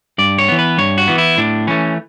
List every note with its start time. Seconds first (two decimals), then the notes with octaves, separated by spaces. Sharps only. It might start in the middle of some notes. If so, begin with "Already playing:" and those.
0.18 G2 D5
0.38 C#5
0.48 E3 B3
0.59 B4
0.78 G2 C#5
0.98 F#4
1.08 E3 B3
1.18 E4
1.38 A2 D4
1.67 E3 A3 C#4